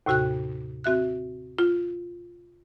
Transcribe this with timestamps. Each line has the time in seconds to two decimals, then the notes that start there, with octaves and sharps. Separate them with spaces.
0.06 D#2 A2 C3 F#4 G5 F#6
0.84 C4 F#4 E5 F#6
1.59 F4